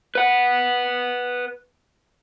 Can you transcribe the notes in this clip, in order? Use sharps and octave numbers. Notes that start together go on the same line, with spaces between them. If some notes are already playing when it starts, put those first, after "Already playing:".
B4 F#5